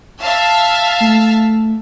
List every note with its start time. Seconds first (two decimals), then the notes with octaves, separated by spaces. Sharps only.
0.21 E5 F5 A5
1.01 A3